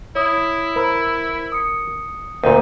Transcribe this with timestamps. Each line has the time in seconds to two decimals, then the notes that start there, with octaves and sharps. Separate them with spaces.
0.15 E4 C#5 D#6
0.76 A#4 C5 B5 E6
1.52 D#6 C#7
2.43 D2 A#2 D#4 A#4